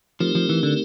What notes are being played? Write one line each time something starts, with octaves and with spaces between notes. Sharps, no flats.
F3 A3 C4 D#4 G4 A#4
F3
E3
D3